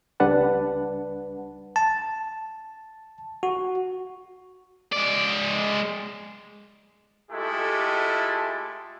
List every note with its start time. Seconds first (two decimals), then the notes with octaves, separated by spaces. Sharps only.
0.20 C#2 G3 D4 B4 F#5 A5
1.76 A5
3.43 F#4
4.93 G#3 D5
7.31 G#3 A3 E4 F4 G4 A4